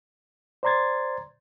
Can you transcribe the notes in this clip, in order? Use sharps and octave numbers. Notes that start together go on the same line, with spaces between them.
C5 D5 A#5 C6 G#6 A6